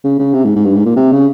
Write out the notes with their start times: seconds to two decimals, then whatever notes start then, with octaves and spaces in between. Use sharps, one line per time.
0.04 C#3
0.19 C#3
0.34 C3
0.45 G#2
0.56 G#2
0.65 G2
0.76 G#2
0.86 A#2
0.96 C3
1.12 C#3